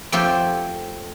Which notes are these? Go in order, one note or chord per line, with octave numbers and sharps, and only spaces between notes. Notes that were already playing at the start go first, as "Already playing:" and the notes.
F2 A3 C4 F4 G4 C#5